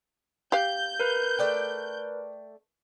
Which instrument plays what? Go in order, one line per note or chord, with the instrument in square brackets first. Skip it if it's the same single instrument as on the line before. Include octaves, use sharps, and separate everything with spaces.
[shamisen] G4 F5 [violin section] G6
[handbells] A#4 B4
[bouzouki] A3 D5 G5